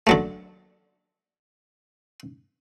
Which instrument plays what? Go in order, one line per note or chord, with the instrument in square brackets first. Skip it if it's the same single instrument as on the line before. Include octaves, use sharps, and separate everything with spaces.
[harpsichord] D3 F#3 A3